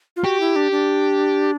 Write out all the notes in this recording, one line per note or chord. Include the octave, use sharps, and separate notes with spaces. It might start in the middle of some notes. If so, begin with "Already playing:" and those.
F4
F#4 G4
E4
D4
D4